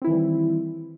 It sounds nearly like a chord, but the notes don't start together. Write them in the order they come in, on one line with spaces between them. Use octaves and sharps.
C4 E4 D#3 E3 G3